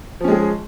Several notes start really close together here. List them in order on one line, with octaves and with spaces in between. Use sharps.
F3 C#4 G#3 G#4